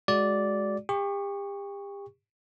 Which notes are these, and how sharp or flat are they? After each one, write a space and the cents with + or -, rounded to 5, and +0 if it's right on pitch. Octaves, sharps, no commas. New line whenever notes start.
G#3 +5 F#4 +0 D5 -10
G4 +35 C#6 +0